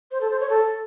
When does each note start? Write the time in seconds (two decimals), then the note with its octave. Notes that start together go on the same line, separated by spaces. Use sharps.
0.11 C5
0.21 A4
0.30 C5
0.40 C#5
0.50 A4